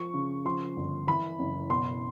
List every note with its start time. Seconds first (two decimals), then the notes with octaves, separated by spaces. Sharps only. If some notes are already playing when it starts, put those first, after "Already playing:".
Already playing: F3 C#6
0.14 C#3
0.45 F3 C6
0.76 G1
1.07 E3 B5
1.39 F#1
1.70 B2 C6